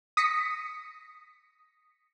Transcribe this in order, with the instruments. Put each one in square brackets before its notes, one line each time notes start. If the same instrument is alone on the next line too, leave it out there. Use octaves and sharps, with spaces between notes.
[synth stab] D#6 A#6 B6 C#7